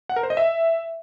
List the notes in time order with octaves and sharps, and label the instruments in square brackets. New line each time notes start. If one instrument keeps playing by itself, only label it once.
[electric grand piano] F#5
A#4
C5
D#5
E5